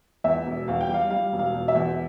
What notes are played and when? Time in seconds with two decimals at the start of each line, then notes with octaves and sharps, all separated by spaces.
0.24 E2 E5
0.46 E1
0.68 E2 F5
0.81 G5
0.89 G3 F5
1.10 G3 F5
1.32 E1
1.39 F5
1.54 E1
1.68 E5
1.75 E2